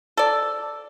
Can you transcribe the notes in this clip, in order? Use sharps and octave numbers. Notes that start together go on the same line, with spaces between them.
A4 D5